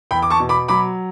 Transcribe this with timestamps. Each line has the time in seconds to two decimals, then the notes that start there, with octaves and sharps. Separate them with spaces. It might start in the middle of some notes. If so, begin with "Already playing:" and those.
0.11 E2 G5 B5
0.22 D6
0.30 A5 C#6
0.40 B2
0.49 B5 D6
0.68 F#3 B5 D6